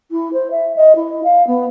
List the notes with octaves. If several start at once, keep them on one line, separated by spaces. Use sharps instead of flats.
E4
C5
E5
D#5
E4
F5
B3